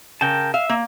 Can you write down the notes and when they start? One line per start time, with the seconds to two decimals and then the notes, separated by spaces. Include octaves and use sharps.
0.21 C#3 A#4 G5 A5
0.54 E5 F5
0.69 A#3